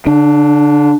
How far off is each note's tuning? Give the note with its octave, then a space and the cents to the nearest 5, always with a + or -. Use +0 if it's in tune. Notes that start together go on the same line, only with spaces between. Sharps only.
D3 -30 D4 +20